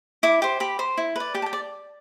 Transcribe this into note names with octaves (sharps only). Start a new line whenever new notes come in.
E4 D6
G4 C5
G4 B5
C5
E4
B4 D5
G4 G5
A5
G5
D5